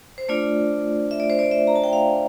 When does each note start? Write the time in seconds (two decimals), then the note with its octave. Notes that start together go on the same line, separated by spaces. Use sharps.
0.18 C5
0.29 A3 D4 F4 D5
1.11 E5
1.20 D5
1.30 C5
1.39 D5
1.51 E5
1.67 A#5
1.76 A5
1.84 G5
1.93 F5